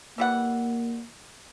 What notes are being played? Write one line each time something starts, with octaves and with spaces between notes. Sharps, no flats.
E3 G3 A#3 F#5